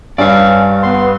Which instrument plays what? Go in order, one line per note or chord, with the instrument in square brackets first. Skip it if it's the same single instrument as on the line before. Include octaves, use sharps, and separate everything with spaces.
[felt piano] G2 [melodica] C#4 [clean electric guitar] D5 F5
[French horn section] B3 [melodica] C6